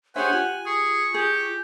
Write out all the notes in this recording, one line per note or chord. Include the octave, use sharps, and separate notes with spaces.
D4 G4 G#4 C5 C#5 E5 F#5 G#5
F4 G4 G#5
G#4 C#6
G4 G#4